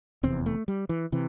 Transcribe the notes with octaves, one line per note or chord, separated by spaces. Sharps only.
F1 E2 C3 C4
A3
G3
E3
C3 E3